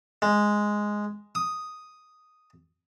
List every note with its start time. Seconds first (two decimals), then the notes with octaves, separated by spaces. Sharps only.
0.22 G#3
1.35 D#6